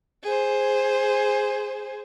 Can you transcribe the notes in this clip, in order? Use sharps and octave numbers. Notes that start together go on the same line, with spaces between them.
G#4 C5